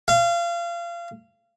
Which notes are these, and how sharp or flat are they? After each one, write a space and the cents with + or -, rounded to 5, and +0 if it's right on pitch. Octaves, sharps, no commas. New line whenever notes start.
F5 -30